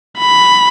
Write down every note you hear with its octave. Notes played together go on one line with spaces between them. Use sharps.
B5